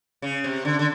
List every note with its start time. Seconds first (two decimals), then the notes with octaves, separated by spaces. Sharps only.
0.22 C#3
0.44 C3
0.65 D3
0.79 D3